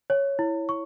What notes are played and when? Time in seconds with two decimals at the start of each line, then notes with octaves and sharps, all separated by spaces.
0.10 C#5
0.39 E4
0.69 C#6